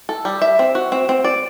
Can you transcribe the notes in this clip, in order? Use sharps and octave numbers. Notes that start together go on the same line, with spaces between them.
A4
G3
E5
C4
F#4
C4
C4
D5